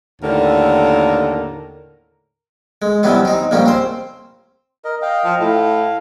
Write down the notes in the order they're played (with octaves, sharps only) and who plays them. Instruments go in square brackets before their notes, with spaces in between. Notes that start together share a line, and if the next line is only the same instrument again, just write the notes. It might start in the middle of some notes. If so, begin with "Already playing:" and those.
[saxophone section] D#2 A2 D3 A#4
[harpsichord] G#3
C3 E3 F#3 G3 B3 C#4
C4 D#4
A#1 F3 G3 A#3 C#4
C4 C5
[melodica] A#4 D#5
D#5 F5 G5
[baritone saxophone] F3
[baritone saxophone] A2 [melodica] F5